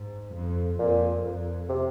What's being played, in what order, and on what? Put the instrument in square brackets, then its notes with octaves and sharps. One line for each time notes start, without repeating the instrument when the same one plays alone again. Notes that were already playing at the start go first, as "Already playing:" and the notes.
Already playing: [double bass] G#2
F2
[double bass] F2 [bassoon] A#2
[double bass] F2
[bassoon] C3